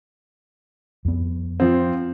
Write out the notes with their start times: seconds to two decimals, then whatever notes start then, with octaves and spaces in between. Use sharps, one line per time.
1.05 F2 B3
1.60 F3 C4